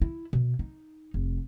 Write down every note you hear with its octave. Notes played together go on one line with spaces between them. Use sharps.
E4
B2
D#4
F1